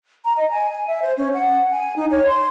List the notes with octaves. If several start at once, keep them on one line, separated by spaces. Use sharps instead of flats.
A#5
D#5
G#5
G#5
E5
C5
C#4
F#5
G#5
D#4
C#5
C6